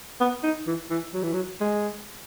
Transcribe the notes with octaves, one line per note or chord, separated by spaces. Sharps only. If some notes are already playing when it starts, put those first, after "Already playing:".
B3
D#4
E3
E3
F#3
E3
F#3
G#3